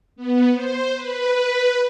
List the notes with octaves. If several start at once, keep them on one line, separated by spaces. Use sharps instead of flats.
B3
C5
B4